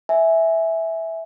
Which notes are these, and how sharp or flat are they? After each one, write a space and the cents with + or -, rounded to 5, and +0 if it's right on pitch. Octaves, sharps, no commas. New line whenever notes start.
E5 -10 G#5 +0